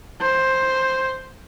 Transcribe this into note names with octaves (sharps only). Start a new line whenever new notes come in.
C5